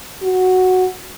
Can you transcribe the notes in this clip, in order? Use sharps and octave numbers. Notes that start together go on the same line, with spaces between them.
F#4